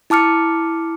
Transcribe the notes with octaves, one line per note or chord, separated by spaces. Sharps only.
E4 A5 D6 F6 C#7